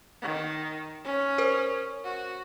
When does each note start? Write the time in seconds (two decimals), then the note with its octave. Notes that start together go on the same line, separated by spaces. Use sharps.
0.22 D#3
1.04 C#4
1.38 A#4 C5
2.04 F#4